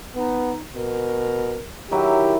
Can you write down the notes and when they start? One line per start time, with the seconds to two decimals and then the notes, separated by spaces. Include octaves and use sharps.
0.16 B3 D#4
0.75 B2 A#4
1.91 D#3 F#3 E4 G4 E5